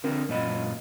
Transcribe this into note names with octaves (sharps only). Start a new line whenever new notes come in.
D3 C4 A#4
F#2 A#2 D#5 B5